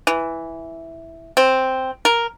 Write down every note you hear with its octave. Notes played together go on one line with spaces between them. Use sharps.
E3
C4
A#4